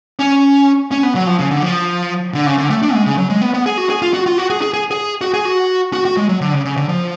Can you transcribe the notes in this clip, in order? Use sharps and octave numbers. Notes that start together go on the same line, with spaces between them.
C#4
C#4
B3
F#3
F3
C#3
D3
F3
D3
C#3
D3
A3
D4
G#3
C#3
F#3
G#3
B3
B3
G#4
F#4
G#4
F4
F#4
F4
F#4
G#4
G#4
G#4
G#4
F#4
G#4
F#4
F#4
F#4
G#3
F#3
D3
C#3
C#3
D3
F3